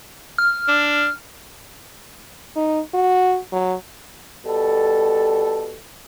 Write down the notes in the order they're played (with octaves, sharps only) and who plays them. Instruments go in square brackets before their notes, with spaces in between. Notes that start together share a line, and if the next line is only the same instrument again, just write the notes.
[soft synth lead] F6
[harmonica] D4
[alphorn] D#4
F#4
F#3
[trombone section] B2 G3 A4